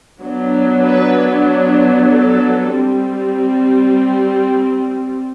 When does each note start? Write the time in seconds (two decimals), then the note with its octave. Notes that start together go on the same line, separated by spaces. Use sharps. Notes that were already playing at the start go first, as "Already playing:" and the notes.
0.23 F#3 B3 D4
0.85 B4
2.09 A4
2.71 G3 C4